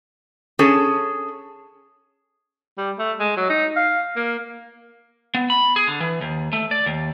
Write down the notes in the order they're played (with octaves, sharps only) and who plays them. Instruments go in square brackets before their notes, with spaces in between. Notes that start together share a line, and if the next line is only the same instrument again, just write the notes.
[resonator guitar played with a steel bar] C#4 G#4 A4
[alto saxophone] G3
A3
G#3
F#3
D#4
F5
A#3
[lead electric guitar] B3
B5
G#4
D3
E3
D#2
A3
D5
D#2